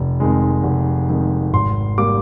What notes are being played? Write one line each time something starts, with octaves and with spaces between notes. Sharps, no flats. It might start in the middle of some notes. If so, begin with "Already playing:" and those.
Already playing: F1
F2 D#3 G#3
F1
F2 D#3 G#3
G#1 C6
G3 A#3 D6